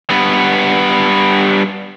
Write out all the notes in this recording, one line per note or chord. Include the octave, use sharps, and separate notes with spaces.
G2 B3